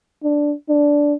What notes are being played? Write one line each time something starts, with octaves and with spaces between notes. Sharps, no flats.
D4
D4